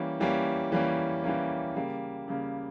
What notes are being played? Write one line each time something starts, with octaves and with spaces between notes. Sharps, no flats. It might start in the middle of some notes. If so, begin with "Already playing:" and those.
Already playing: E3 G3 A#3 C#4
E3 G3 A#3 C#4
E3 G3 A#3 C#4
E3 G3 A#3 C#4
C#3 G3 A#3
C#3 G3 A#3